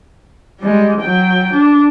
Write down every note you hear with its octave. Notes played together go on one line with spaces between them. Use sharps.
G3 G#3
F#3 G5
D4